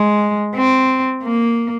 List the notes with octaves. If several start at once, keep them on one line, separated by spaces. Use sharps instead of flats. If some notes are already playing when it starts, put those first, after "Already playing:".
Already playing: G#3
C4
A#3